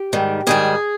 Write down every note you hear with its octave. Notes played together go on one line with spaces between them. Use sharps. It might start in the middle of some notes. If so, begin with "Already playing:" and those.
Already playing: G4
G#2 D#3 G3
G#2 D#3 G3 G#4